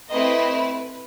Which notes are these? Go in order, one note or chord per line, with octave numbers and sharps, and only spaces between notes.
A3 C4 E4 B4 D#5
B4